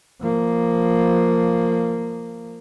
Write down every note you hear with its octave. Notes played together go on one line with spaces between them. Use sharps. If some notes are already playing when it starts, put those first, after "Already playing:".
F3 A#3